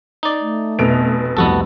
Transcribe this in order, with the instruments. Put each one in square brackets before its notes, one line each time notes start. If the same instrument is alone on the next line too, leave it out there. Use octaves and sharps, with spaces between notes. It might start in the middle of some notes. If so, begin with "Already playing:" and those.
[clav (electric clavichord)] D#4 D5
[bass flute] A3
[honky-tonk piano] F1 B2 F7 [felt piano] D7
[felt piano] C2 F2 [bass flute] A3 [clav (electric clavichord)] B3 F#4 A4